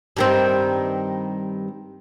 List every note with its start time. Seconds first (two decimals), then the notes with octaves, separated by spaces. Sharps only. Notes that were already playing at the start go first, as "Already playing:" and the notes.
0.17 G2 D#3 C4